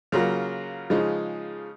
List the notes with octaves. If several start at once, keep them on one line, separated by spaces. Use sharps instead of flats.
C#3 F#3 A#3 F4
C#3 F3 G#3 D#4